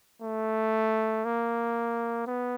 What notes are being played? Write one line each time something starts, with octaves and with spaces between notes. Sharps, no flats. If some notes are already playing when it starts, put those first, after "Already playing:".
A3
A#3
B3